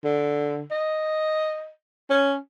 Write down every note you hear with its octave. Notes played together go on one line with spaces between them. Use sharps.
D3
D#5
C#4